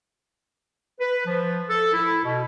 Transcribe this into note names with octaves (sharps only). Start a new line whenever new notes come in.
B4
F3
A4
E4
B2